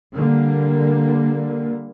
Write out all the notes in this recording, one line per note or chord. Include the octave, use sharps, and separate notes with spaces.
D3 G3 A#3